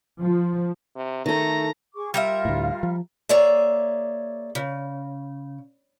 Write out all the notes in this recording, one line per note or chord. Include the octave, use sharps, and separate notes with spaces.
F3
C3
D#3 A3 A4 A#5 A#6
G#4 C#6 D6
G3 F4 A#4 E5 F5 F6
D2 A2
F3
A#3 G#4 C#5 D5 E5
C#3